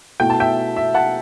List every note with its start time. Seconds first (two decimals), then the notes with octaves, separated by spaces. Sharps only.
0.20 B2 A3 E4 G5
0.30 A5
0.40 E5 G5
0.76 E5
0.94 F#5 A5